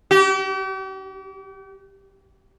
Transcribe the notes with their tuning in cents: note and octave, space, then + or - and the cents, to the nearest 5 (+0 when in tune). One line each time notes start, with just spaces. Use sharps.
G4 -40